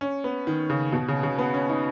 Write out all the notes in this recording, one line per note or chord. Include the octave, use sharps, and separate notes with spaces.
C#4
B3
D#3
C#3
B2
C#3
C#3
B3
C#4
D#4